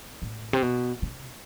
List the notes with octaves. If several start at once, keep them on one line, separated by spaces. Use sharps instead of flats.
A2
C3
B2
C3